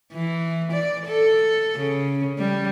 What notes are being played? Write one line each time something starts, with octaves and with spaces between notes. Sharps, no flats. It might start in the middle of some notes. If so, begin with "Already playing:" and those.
E3
D5
A4
C#3
G3